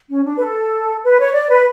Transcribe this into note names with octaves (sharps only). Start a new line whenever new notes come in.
C#4
D4
B4
A4
B4
C#5
D5
B4